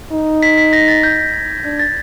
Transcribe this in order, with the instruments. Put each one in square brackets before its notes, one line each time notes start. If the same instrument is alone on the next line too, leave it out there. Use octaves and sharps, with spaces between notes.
[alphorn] D#4
[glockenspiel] B6
B6
A#6
A6
G6
G#6
[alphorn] D4 [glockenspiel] G#6
[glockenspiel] A6